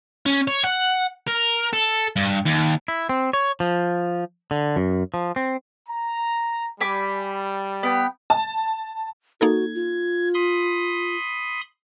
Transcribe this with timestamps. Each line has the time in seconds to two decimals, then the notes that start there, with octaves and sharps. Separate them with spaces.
0.26 C#4
0.48 C#5
0.64 F#5
1.28 A#4
1.73 A4
2.16 G2
2.46 D#2
2.88 E4
3.09 C4
3.33 C#5
3.60 F3
4.51 D3
4.76 F#2
5.14 F3
5.36 C4
5.89 A#5
6.81 G3 G#5 B5 D6
7.83 B3 G5
8.30 A5
9.41 A#3 D#4 F#4 A4 G#6
9.75 F4
10.34 B5 C6 D#6